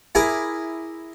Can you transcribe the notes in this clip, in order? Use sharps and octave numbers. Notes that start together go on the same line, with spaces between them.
E4 G#4 A#4 D6